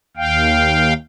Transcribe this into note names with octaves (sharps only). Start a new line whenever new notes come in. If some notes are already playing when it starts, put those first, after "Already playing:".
D#2 F5 G5